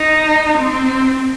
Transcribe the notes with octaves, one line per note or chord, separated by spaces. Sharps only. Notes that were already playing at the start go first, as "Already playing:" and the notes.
Already playing: D#4
C4